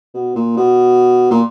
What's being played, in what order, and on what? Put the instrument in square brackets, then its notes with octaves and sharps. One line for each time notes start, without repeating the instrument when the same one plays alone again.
[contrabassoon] B2
A#2
B2
A#2